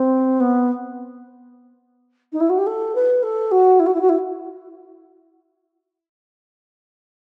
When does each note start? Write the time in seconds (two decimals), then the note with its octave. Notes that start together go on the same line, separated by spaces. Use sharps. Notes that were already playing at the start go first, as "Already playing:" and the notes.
Already playing: C4
0.40 B3
2.32 D#4
2.40 E4
2.49 F#4
2.58 G4
2.66 A4
2.95 B4
3.23 A4
3.51 F#4
3.79 E4
3.86 F#4
3.94 E4
4.01 F#4
4.09 E4